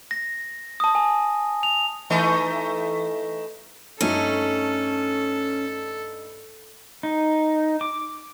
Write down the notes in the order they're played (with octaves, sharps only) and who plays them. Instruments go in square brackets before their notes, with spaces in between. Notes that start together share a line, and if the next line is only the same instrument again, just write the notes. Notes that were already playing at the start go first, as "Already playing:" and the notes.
[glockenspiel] A#6
A5 D#6
G#5
F7
[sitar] E3 A3 D#4
[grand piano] G2 A3 D#4 [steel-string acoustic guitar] C#4 [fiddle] A4
[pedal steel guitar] D#4
D6